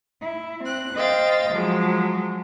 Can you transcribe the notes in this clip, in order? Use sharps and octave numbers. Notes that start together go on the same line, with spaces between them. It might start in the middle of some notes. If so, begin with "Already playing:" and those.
E4
C4 F#6
C5 D#5 F5 G5 A6
F3 F#3 G#3